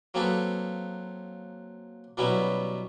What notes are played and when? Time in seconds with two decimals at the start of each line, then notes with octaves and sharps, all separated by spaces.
0.14 F#3 A#3 C4 G#4 A4 B4
2.17 B2 F#3 G3 B3 C#4 E4